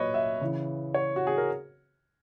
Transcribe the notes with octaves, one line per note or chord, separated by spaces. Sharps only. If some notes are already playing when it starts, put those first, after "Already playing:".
Already playing: A#2 F#3 B4 C#5 D#5
E5
C#3 E3
C#5
F#4
G#4
A#4